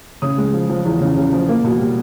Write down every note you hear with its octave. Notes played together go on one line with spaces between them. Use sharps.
C#3 D#6
G#3
F3
F3
E2
C#3
C#3
F3
A#3
B2
G3